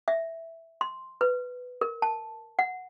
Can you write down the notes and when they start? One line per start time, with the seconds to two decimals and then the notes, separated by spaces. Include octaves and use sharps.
0.08 E5
0.81 C6
1.21 B4
1.81 A#4
2.02 A5
2.59 F#5